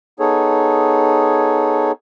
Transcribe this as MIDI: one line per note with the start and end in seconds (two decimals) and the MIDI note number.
0.20 1.92 59
0.20 1.92 63
0.20 1.92 68
0.20 1.92 69
0.20 1.92 73